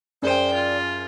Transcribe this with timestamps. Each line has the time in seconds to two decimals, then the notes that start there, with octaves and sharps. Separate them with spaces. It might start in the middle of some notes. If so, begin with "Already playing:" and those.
0.22 F#2 G#4 C5 D5 G5 D#7
0.53 F4